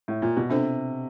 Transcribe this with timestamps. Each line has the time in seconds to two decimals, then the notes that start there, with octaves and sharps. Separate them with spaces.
0.08 A2
0.22 A#2
0.37 B2
0.49 C3 B3 D4 F4 A4 C5